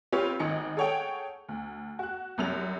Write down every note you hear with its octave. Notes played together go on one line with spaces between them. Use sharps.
C4 F4 G4 B4 C#5
G#1 D#4 C#7
G#4 A4 C#5 F#5 G5
D2
F#4 F#6
C2 F#2 F7